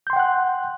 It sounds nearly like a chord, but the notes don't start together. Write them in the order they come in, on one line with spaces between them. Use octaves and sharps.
G6 C6 G5 F#5 F#6